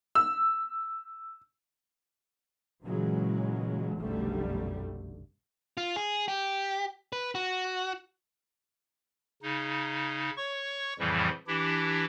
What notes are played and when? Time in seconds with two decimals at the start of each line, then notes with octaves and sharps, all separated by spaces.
0.15 E6
2.83 A#2 C#3 E3 F#3 G#3
3.96 F1 B1 F#2 D3 G3 A3
5.77 F4
5.96 G#4
6.28 G4
7.13 B4
7.35 F#4
9.42 C#3 D#4
10.37 C#5 C#6
10.99 F2 A2 C#3 E3 F3 G3
11.47 E3 D4 E4 G4